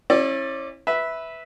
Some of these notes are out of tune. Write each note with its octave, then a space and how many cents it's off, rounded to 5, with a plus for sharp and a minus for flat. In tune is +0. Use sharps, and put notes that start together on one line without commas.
C#4 -35 E4 +0 D5 +0
B4 +0 E5 -10